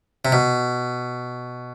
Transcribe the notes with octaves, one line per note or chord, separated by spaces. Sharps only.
C3
B2